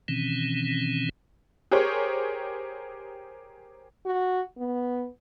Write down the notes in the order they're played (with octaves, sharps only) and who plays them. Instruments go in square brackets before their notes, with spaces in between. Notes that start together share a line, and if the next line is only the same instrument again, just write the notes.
[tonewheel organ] B2 D#3 E3 C4 C#4
[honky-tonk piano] G4 G#4 A#4 C5 C#5
[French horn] F#4
B3